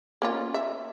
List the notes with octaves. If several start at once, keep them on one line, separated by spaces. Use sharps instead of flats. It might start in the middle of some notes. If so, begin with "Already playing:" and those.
A#3 C#4 F4
E5